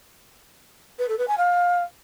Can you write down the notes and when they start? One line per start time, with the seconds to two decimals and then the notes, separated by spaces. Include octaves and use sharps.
0.99 B4
1.08 A4
1.18 B4
1.28 G#5
1.37 F5